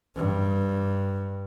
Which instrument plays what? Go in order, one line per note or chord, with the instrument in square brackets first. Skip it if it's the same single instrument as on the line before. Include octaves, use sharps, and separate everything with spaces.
[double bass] G2